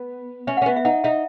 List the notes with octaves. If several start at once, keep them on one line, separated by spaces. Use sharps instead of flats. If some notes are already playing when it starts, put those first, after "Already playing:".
Already playing: B3
C#4 E5
F#5
C#4
B3 E5
E5
D#4 F#5
D#4 E5